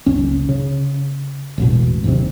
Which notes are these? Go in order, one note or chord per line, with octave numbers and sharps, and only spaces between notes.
F#1 C#2 C#4
C#3
E1 A1 B2
F#1 D#2 C3